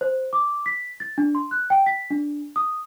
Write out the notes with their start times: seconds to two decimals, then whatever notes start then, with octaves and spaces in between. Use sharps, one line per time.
0.01 C5
0.33 D6
0.66 B6
1.00 A6
1.18 D4
1.35 C6
1.51 F#6
1.70 G5
1.86 B6
2.10 D4
2.56 D#6